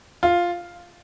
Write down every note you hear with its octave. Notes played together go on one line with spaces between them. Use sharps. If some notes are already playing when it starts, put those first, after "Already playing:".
F4